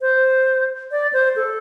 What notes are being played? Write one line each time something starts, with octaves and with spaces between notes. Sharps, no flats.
C5
D5
C5
A4